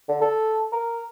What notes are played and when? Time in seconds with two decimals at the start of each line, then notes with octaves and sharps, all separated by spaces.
0.09 D3
0.21 A4
0.72 A#4